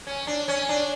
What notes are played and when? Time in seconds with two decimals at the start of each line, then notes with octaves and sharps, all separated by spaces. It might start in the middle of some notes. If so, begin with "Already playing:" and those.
0.07 C#4
0.27 D4
0.48 C#4
0.69 D4